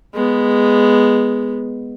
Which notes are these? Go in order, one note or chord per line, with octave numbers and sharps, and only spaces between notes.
G#3 B3